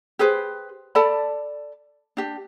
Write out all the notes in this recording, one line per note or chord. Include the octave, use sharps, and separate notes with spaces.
G4 G#4 B4 C5
A4 D5 A5 B5
D4 G4